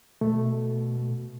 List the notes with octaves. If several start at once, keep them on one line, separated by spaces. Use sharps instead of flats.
B2 A3